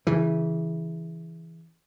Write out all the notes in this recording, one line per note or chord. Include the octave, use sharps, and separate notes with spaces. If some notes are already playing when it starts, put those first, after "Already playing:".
C#3 E3